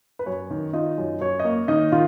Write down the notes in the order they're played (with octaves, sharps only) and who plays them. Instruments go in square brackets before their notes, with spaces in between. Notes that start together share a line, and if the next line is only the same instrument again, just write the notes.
[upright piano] B4
F#2 C#5
D#3
D#4 F4 D#5
F#2
F#2 C#5
D#5
A#3 C#5
D#3 D#4 D#5
D#3 F4 F5